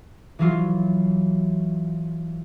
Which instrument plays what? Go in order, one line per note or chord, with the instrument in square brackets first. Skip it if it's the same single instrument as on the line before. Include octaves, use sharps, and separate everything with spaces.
[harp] E3 F#3 F4